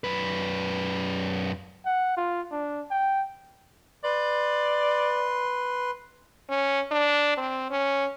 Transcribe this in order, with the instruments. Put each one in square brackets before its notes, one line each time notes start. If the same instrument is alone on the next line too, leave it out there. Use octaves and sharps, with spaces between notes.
[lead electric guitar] F#2 B4
[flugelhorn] F#5
F4
D4
G5
[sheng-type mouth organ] B4 C6 [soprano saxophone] D5
[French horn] C#4
D4
C4
C#4